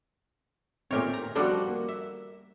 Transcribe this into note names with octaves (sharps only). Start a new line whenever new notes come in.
A#2 A3 C4 G4 A#4 C#5
A#5
F3 G3 D4 F#4 A4
A#3
E5